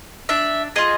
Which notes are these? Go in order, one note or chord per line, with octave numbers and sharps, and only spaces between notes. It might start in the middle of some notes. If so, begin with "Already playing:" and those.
D4 E5
F4 G#4 D#5